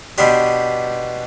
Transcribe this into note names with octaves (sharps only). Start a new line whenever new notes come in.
B2 B3 D4 G4 C5